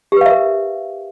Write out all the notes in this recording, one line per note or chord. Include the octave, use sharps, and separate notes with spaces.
G4 A#4 B4 E5 F5